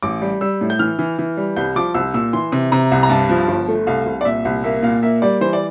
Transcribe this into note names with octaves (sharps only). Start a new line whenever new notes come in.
A1 D6
G3
G3 E6
A2
G6
E3 F6
E3
E3
G3
C2 G6
F3 D6
C2 E6
A#2 E6
E3 C6
C3
C3 A#5
C2
A#5
G2 A5
F3
G1
A3
C2 F5
C2
D5
A#2 E5
C2
A#3 E5
A#2 F5
A#3 E5
G3 D5
E3 C5
D5